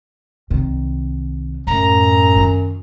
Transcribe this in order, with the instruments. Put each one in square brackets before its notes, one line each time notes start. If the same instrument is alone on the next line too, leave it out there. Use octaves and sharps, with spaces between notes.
[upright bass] C2 D#3
[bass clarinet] F#2 [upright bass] A2 [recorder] A#5
[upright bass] D#3 F4